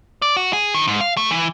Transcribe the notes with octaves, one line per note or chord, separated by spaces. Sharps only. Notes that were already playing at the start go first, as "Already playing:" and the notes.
D5
F#4
G#4
D#3
G#2
F5
A3
E3